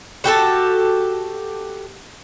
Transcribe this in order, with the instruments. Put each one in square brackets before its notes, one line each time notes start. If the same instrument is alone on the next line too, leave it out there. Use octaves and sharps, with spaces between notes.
[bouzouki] F#4 G4 A4 A5